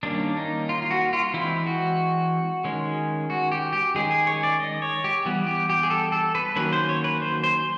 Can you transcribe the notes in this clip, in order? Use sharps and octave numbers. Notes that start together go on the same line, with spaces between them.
D#3 G3 A#3 C#4 D4
D#4
F4
F4
F#4
F4
E3 G#3 C4 E4
F#4
D#3 G#3 C#4
F#4
G4
G4
D#3 G#3 C#4 G#4
G#4
C#5
D5
D#5
C#5
G4
E3 G3 B3
G4
G4
G#4
A4
A4
B4
D#3 F#3 A#3 C#4 B4
C5
C#5
B4
C5
C5